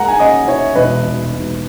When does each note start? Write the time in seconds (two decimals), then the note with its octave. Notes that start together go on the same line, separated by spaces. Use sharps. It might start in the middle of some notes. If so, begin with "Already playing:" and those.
Already playing: G#3 A#3 F#5 A#5
0.08 G#5
0.19 C#4 D#5 F#5
0.47 E4 C#5
0.75 E1 B4 D#5
1.04 E1
1.32 E1